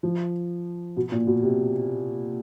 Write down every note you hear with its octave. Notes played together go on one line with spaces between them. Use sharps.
F3
B2
A#2
B2
C3